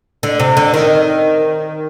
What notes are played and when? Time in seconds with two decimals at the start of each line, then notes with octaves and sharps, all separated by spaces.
0.23 D3
0.40 C3
0.57 D3
0.74 D#3